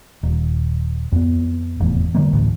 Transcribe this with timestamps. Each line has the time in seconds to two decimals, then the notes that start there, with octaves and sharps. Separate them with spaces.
0.23 D#1
1.12 F2 B3
1.80 F1 E2 A2
2.15 D3 F#3 G3 A#3
2.33 A1 D2 A2